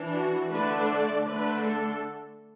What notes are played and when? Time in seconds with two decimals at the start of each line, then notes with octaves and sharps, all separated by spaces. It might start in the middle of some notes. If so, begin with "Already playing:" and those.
Already playing: E3 D4
0.13 F#4
0.50 D3 A3 D4 B4
0.88 D5
1.26 D3 A3 D4 B4
1.64 A4